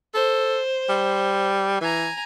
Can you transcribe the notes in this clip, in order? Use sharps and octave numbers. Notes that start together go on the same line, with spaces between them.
A4 C5
G3
E3 G#5 A#5